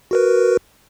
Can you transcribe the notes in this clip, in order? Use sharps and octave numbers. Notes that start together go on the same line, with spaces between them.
F#4 A#4 B4